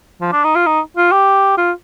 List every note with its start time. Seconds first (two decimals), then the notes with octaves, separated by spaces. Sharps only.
0.21 F3
0.32 D4
0.44 D#4
0.55 F4
0.66 D#4
0.97 F4
1.12 G4
1.58 F4